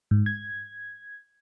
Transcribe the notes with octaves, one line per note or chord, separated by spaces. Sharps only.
G#2
G#6